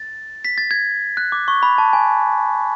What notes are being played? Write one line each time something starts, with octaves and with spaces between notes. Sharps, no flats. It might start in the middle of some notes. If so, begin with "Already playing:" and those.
Already playing: A6
B6
A6
G#6
F#6
D6
C#6
B5
A5
G#5